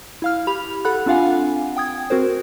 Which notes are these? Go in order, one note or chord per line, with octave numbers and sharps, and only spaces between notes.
E4 F5 F6
G4 B5 F7
A4 F#5 B5 F#6
C4 D4 F4 F5 F#5 G#5
G5 D#6 G#6
C4 F#4 A#4 C5